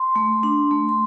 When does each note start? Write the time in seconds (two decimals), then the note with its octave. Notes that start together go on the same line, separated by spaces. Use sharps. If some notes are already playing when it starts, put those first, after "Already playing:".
Already playing: C6
0.16 A3
0.43 D4
0.71 A3
0.89 C6